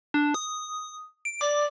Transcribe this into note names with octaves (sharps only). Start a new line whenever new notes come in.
D4
D#6
D7
D5 D6